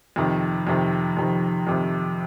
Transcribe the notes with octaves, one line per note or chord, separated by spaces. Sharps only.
F2 C3 D#3
F2 C3 D#3
F2 C3 D#3
F2 C3 D#3